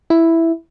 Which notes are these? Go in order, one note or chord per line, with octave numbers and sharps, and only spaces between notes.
E4